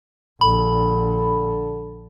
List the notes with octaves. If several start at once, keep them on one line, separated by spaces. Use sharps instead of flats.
A#1 D3 A4 B5